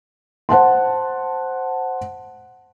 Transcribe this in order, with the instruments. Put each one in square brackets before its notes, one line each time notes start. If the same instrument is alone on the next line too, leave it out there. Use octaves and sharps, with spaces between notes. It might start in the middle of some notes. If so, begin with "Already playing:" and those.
[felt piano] C5 F#5 A5 C6